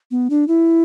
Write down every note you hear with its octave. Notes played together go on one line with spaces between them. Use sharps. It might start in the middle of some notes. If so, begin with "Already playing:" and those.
B3
D4
E4